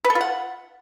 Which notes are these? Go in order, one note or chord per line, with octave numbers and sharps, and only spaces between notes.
B4
A4
F4
F#5